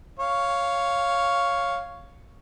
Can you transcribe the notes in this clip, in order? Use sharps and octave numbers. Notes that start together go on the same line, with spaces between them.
C#5 F5